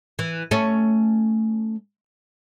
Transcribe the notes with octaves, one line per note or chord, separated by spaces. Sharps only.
E3
A3 C#4